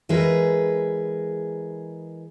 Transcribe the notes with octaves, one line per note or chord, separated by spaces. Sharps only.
E3 G#3 G#4 A#4 B4